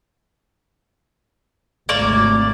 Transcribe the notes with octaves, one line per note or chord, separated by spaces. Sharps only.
G#1 D2 C3 A#3 C#5 D5